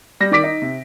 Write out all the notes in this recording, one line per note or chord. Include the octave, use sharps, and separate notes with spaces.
G3 A#6
D#3 D5 D6 B6 D7
D#4
C3